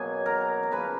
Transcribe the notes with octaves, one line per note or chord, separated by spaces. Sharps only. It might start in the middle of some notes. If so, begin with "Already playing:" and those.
Already playing: B2 F#3 A#3 G#4 G#5
A#4 A#5
A#5
C#3 F3 A#3 B4 B5